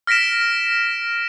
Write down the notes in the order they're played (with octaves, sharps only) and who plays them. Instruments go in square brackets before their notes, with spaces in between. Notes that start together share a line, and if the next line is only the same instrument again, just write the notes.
[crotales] F6 A#6 B6 D7 E7